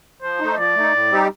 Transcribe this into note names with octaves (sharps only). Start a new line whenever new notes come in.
F3 C5
A3 D#4
F3 D5
A3 D#4
A2
G3 C4 D#4 G4